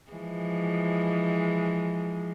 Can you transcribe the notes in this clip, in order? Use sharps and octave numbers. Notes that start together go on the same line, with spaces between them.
E3 F3 G#3